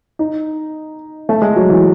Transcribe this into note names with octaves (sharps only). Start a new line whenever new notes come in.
D#4
A3
G#3
F#3
E3